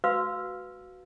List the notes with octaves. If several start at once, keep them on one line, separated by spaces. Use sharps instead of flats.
F#4 B4 F5 E6